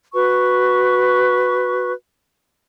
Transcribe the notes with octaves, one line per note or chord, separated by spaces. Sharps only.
F#4 B4 C#6